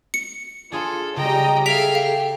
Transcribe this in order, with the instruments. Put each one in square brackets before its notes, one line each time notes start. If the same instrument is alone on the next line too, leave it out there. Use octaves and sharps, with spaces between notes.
[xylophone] C#7
[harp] D4 G#4 C6 [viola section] F4 [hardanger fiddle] A4
[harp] C#3 [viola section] G3 D#5 A#5 [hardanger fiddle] G5
[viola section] G#4 A4 [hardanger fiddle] E5 F5 [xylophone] G5 B6 F7
[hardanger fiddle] G4 [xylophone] F5